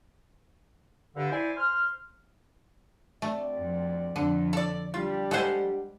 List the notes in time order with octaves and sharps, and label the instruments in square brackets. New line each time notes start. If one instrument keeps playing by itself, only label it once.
[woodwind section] G2 D3
E4 G#4 C5 D5 G#5
C5 C6 F6
[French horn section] D2 C4 D5 [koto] A3
[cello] F2
[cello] F2 [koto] D3
[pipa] A4 D5
[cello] G3 [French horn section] D4 G4 [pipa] F4
[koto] G#3 C5 [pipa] A4 F#5 G#5